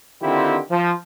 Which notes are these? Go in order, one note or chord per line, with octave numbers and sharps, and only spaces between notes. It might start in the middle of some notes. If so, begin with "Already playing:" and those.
D3 D#3 C4 E4 F4 G4
F3